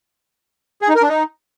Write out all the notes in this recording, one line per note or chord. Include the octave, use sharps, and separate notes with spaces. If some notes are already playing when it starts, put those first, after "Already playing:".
G#4
D#4
A#4
D4
D#4